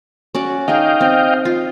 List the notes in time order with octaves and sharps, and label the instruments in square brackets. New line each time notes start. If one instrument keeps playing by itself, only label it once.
[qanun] C#4 F#4 D5
[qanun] D#4 G#4 [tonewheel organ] D#5 F5 G5
[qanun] C4
F4